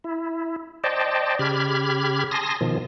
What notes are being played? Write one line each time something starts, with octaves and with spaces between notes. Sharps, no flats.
E4
C5 D5 D#5 G5 A5
C#3 G4 B5 F6 G#6
G#5 A5 C6 D#6 A#6
B2 D#3 F3